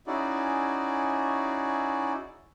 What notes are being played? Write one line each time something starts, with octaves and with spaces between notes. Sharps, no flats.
C#4 D#4 E4 F#4 G#4 D5